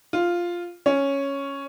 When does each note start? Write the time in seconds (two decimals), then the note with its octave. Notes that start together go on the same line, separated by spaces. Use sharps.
0.13 F4
0.86 C#4